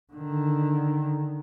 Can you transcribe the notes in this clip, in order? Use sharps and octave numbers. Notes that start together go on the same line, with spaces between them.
D3 D#3